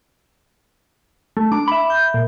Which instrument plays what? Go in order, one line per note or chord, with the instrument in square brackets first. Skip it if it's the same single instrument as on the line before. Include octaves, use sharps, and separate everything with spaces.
[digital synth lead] A3
[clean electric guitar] D4 [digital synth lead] D6
[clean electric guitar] E5 B5
[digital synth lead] G6
A#2